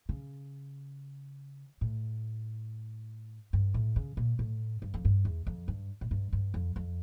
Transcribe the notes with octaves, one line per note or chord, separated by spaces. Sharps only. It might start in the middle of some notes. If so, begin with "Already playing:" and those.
C#3
A2
G2
A2
C#3
A#2
A2
G2
F2
G2
E2
F2
G2
A2
G2
G2
F2
F2